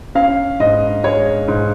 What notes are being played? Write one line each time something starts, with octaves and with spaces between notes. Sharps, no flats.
C#4 F5
G#2 D#5
G#3 C#5
G#2